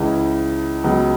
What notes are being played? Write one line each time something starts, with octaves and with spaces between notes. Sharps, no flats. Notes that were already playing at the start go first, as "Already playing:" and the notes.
Already playing: C#2 C#3 E3
C#2 C#3 F#3 B3